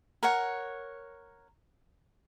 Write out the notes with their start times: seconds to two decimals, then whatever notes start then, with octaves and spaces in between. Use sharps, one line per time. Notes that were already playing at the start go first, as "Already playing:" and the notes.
0.23 A#4 C#5 F#5